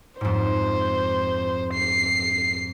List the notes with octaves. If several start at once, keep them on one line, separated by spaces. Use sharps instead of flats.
F2 G#2 C5
C7